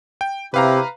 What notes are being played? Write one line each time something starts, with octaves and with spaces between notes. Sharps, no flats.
G5
C3 E4 G4 B4 F5 A#5